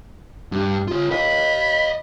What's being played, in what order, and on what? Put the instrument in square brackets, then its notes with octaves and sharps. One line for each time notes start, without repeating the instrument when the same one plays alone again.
[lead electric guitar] G2
F4 C#5
[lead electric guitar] D#5 F5 [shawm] B5